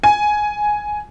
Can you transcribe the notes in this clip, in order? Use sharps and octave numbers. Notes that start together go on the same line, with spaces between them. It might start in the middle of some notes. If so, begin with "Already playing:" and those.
G#5